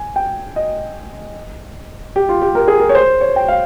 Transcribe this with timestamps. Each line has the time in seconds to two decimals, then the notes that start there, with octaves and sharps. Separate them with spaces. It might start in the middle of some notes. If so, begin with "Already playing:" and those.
Already playing: G#5
0.16 G5
0.56 D#5
2.16 G4
2.29 F4
2.42 G4
2.55 A#4
2.68 G#4
2.80 A#4
2.89 C#5
2.95 C5
3.21 C#5
3.36 G5
3.48 F5